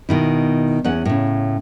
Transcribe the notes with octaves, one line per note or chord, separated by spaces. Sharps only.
B2 D#3 E4
E2 C#4 F#5
A2 C#3